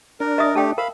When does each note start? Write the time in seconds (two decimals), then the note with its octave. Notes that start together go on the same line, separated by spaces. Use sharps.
0.20 D4 A#4
0.38 D#5 E5 D#6
0.55 A3 G4 G5 A5
0.78 A#4 F5 B5